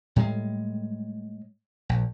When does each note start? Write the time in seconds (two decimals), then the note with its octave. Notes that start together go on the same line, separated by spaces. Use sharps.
0.16 A2 G3 G#3
1.89 A#1